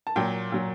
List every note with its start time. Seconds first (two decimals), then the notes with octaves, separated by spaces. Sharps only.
0.07 A5
0.16 A#2 F#3 G5
0.52 A#2 F#3